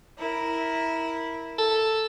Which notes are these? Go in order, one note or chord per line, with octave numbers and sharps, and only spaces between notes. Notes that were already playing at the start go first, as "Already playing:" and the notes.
E4 A#4
A4